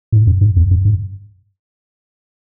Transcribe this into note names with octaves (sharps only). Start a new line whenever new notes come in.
A2
F#2
G2
F2
F#2
G2